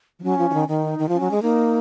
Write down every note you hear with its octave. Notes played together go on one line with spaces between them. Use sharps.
F3
F#3 C#4
F3
F3
D#3
D#3
D#4
D#3
F3 C#4
F#3
G#3
A#3 D#4